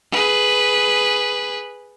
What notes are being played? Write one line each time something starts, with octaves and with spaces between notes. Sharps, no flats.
G#4 B4